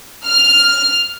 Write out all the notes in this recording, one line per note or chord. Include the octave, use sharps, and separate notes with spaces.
F6